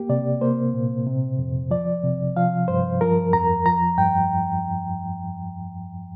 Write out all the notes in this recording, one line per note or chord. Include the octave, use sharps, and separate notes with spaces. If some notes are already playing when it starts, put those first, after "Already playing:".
Already playing: A#3 G4
C3 D5
A#3 C5
A#2
C3
F2
F3 D5
C3
F3 F5
G2 C5
F3 A#4
F2 A#5
F3 A#5
G2 G5